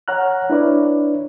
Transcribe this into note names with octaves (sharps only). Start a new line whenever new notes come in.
C#5 F#5 A#5 F6 F#6
D4 E4 B4 C#5 D5